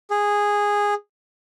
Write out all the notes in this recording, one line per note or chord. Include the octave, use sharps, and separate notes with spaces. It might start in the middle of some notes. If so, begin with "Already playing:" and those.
G#4